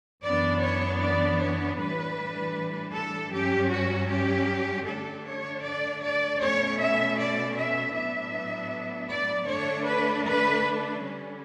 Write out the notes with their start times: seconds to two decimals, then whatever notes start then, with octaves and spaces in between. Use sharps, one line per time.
0.24 F#2 E3 B3 D4 D5
0.62 C#5
1.01 D5
1.39 C#5
1.78 A2 E3 G3 D4 B4
2.94 A4
3.32 G2 F#3 C#4 G4
3.71 F#4
4.09 G4
4.87 D3 A3 D4 A4
5.25 C#5
5.63 D5
6.02 D5
6.40 B2 A3 C#4 C#5
6.79 E5
7.18 D5
7.56 E5
7.94 A2 F#3 B3 D4 E5
9.10 D5
9.48 D3 A3 D4 C#5
9.87 B4
10.26 B4
11.03 D3 G3 C#4